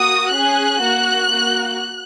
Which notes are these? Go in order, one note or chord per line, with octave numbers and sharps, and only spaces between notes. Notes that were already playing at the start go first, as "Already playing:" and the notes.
Already playing: A#3 F#4 D#6
C#4 G#4 F#6
A#3 F#4
A#3 F#4